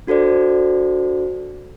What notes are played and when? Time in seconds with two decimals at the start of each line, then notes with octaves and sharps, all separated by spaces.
0.07 D4 F#4 A4 C5 D5